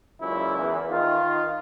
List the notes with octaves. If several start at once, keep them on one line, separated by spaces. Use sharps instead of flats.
C#2 F#2 A#2 E4
E2
D#3 F4